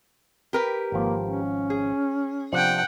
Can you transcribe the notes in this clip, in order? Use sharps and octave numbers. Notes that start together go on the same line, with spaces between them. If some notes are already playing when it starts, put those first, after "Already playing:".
G4 A#4 B4
G#1 F3 A#3
C#4
G#4
C3 F3 D4 F#5 G5